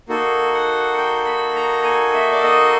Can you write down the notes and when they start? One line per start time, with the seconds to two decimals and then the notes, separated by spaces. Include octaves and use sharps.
0.09 A#3 D#4 F#4 A4
0.54 F#5
0.98 G5
1.26 B5
1.55 A#5
1.84 G#5
2.14 E5
2.32 D5
2.43 D#5